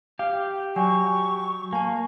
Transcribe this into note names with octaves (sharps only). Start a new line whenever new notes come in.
G4 F5
F#3 D5 F#5 G#5 C#6
A#3 G#5 A5